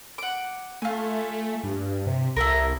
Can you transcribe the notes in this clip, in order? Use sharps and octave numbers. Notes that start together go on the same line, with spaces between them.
F#5 D6
A3 F4 G#5
G2
C3
C2 E4 A4 A#4